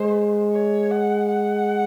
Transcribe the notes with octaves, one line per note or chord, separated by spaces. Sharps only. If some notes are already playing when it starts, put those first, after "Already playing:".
Already playing: G#3 C5
C#5
F#5
F#5